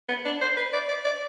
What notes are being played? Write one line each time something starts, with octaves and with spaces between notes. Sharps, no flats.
B3
D4
C5
B4
D5
D5
D5